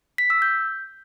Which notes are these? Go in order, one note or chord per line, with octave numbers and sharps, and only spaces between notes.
B6
E6
G6